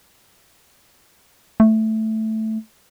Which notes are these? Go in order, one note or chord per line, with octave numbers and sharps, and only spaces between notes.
A3